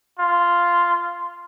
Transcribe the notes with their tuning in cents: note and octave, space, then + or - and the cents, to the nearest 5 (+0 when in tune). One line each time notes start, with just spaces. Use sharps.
F4 -5